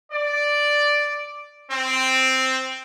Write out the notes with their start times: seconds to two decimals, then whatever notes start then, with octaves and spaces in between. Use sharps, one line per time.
0.11 D5
1.71 C4